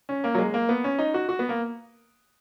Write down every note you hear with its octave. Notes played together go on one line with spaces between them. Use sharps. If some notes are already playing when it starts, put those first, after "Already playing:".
C#4
A#3
F#3
G#3
A#3
B3
C#4
D#4
F#4
F#4
B3
A#3